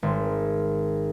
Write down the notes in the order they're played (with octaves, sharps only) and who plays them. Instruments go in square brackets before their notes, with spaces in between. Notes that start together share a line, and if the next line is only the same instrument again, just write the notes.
[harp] G#1